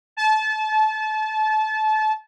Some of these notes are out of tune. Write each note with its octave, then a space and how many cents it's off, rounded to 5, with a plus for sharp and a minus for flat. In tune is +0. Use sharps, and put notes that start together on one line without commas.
A5 -30